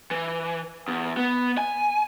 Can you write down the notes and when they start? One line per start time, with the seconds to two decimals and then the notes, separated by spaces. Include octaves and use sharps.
0.11 E3
0.88 E2
1.17 B3
1.58 G#5